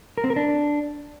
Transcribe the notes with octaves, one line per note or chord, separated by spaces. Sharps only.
A#4
C4
A#4
D4